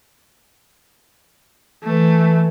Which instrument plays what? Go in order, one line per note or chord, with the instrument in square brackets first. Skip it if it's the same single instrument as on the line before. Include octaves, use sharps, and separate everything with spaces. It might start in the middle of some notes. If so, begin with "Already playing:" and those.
[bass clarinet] E3 [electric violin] A3